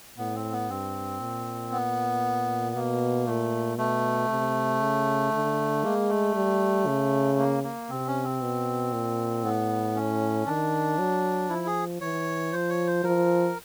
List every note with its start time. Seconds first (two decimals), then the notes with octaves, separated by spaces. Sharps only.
0.18 A2 B3
0.35 C4
0.53 B3
0.70 G2 C4
1.21 A#2
1.72 B3
2.75 B2 A#3
3.26 A#2 A3
3.77 B2 A3
4.29 C3
4.81 C#3
5.32 D3
5.84 G#3 A#3
6.09 A3
6.35 G3
6.87 C#3
7.38 A#3
7.64 A#3
7.90 C3 C4
8.07 C#4
8.24 C4
8.41 B2
8.93 A#2
9.44 A2 B3
9.95 C#4
10.46 D#3 D4
10.99 F#3
11.49 F3 E4
11.67 G#4
12.01 E3 C#5
12.52 F3 C5
12.70 C#5
12.87 C5
13.04 F3 A#4